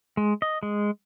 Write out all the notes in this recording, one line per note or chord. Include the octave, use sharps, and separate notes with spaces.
G#3
D#5
G#3